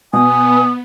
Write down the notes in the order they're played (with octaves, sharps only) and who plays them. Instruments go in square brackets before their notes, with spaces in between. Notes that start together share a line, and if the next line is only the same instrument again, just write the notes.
[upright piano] B2 [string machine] B3 [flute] G#5 [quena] D#6